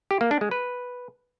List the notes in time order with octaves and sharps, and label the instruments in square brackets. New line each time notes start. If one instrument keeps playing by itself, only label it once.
[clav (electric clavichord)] G4
A#3
D4
G#3
B4